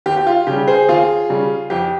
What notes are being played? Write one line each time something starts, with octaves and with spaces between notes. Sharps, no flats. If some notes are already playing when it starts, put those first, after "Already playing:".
D#2 G4
G4
F4
C#3 G3 G4
G#4 C5
D#2 F4 G#4
C#3 G3
F2 G4